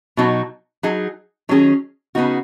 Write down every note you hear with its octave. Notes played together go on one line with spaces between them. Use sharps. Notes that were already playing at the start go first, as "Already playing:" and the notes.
B2 F#3 D#4 F#4
F#3 D#4 G#4
D#3 F#3 C#4 G#4
C#3 B3 D#4 F#4